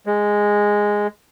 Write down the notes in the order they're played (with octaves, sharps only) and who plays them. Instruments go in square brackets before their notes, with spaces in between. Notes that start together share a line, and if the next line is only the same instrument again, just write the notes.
[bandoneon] G#3